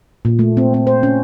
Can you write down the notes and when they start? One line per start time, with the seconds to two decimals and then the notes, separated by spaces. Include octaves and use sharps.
0.25 A#2
0.39 A3
0.57 C4
0.74 C4
0.87 C5
1.03 C#4